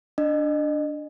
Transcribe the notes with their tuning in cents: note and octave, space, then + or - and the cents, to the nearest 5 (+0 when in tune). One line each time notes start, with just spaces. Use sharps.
D4 +0 D#5 -30